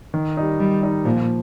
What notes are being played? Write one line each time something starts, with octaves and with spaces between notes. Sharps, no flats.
D#3
G3 D#4
D#3 G3
G3 D#4
A#2 F3